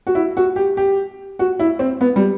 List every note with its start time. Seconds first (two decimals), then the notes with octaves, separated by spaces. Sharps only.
0.07 F#4
0.15 E4
0.37 F#4
0.56 G4
0.77 G4
1.39 F#4
1.59 E4
1.79 C4
2.01 B3
2.16 G3